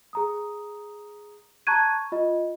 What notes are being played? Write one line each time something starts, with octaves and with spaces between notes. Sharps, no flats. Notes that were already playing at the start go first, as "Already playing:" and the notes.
G#4 A#5 D#6
A5 A#5 C#6 F#6 G#6 D#7
F4 D#5